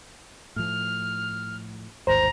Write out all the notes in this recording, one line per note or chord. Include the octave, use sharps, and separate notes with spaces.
A2 F3 F6
A1 D#2 G#2 C5 A#5